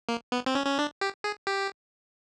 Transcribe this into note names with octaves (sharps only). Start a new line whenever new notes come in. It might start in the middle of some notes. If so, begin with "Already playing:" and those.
A#3
B3
C4
C#4
C#4
D4
G4
G#4
G4